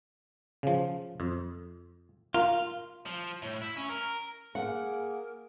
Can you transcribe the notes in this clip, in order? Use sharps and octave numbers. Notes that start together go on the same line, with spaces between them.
C#3 F3
F2
F4 A#4
F3
A2
E4
C#4
A#4
A#3 G#4 A#4 F#5